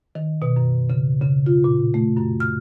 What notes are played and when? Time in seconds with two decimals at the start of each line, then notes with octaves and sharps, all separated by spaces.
0.15 D#3
0.42 B2
0.56 F#2
0.90 C#3
1.22 C#3
1.46 F4
1.64 A#2
1.94 A3
2.17 F#2
2.40 F6